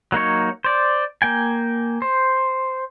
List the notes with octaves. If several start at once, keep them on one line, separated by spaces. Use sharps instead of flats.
F#3 A#3 D#4 C#5
C5 D5
A#3 G5 G#5
C5